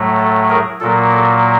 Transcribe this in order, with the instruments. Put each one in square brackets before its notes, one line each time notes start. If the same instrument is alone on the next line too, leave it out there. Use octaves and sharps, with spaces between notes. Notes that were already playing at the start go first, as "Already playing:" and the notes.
Already playing: [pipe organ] A2 F#3 A3
A4
G#4 A#4
A#2 F#3 A#3 A4
A4